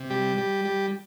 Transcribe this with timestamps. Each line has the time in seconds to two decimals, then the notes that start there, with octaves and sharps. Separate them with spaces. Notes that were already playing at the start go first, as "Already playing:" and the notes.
Already playing: C3
0.10 G3 G4
0.38 G3
0.65 G3